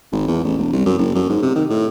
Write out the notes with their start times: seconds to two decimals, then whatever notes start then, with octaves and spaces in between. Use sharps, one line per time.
0.12 G#1
0.28 E2
0.45 A1
0.58 E1
0.73 C2
0.86 F#2
0.99 F#1
1.15 F#2
1.29 G#2
1.43 C3
1.56 D#3
1.70 A2